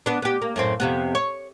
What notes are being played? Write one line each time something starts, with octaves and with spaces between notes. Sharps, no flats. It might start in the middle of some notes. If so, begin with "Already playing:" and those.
B3 D4
B3 G4
A#3
F#2 A2 C4
F2 C3 B3
C#5